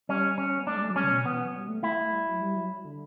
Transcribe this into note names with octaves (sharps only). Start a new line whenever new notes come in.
G3 C#4
C#4
B3
A3 D4
G3
A3
F#3
G3 C#4
C#3
B2
E3 B3
F#3
G3
A3
A3 E4
A3
G3
F#3
G3
F#3
D3